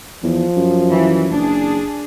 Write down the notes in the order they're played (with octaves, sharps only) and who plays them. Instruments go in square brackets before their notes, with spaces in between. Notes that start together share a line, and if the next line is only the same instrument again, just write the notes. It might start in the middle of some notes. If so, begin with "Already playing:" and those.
[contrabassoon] E2 [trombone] F3
[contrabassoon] F#2
[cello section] E3
[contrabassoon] F#1 [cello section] D4 G#4